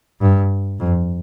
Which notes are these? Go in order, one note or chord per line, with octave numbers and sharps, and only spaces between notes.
G2
F2